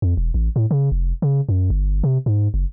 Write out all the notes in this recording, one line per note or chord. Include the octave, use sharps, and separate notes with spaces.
F2
E1
A1
A2
C#3
F1
C#3
F#2
G1
C3
G#2
F#1